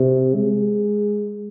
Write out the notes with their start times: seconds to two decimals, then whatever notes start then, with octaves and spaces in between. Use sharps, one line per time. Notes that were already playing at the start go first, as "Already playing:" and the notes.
Already playing: C3
0.36 G#3